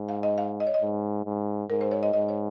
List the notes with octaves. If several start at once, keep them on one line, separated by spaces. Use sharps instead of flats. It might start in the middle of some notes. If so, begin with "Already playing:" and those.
Already playing: G#2
F5
D#5
F5
D#5
C#5
D#5
G#2
G#2
G#2 A#4
C5
C#5
D#5
G#2 D#5
C#5